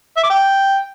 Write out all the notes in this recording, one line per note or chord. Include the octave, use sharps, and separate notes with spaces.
E5
D6
G5